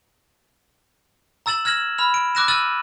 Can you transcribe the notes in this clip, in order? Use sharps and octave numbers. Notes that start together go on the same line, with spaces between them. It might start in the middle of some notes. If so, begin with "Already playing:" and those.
A#5 E6 A6 E7 F#7
F6 G#6 A#6 E7 F#7
B5 F6
D7
D6 E6 F#6 A#6 D7 E7
E6 F6 A6 D#7 F#7